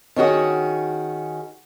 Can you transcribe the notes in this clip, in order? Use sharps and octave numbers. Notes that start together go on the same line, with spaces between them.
D#3 C#4 F#4 G#4